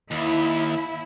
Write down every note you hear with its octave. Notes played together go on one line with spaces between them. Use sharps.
D#2 E4